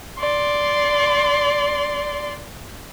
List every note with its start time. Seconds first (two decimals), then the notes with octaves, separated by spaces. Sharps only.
0.19 D5 C6